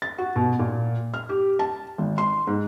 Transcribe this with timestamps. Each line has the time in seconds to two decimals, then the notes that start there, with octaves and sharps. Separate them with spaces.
0.02 A6
0.18 F#4
0.36 B2
0.59 A#2
1.14 F6
1.29 G4
1.59 A5
1.98 G#1
2.18 C6
2.47 G#2